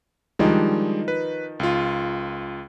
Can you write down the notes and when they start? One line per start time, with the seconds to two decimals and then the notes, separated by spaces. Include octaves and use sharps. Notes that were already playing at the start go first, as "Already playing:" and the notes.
0.39 D#3 F3 G3 G#3 D4 D#4
1.08 B4
1.60 C#2 F4